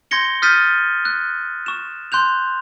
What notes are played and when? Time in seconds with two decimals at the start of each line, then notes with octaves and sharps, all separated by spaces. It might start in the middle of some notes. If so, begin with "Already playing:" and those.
0.11 C6 G6 G#6 A#6 C#7 G7
0.42 D#6 F6 G6 A6 B6 D#7
1.05 F#6
1.66 C#6 E7
2.12 C6 F#6 G6 F7